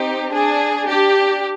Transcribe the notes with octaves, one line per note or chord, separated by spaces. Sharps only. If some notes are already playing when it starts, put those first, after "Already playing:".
Already playing: C4 D#4 G4
D4 G#4
D4 G4